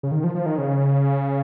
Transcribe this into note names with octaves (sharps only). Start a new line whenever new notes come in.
C#3
D#3
F3
F3
D#3
C#3